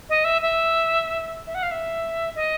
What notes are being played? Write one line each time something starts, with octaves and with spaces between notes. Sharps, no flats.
D#5
E5
E5
E5
F#5
F5
E5
D#5